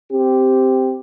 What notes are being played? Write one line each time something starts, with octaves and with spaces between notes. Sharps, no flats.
C4 G4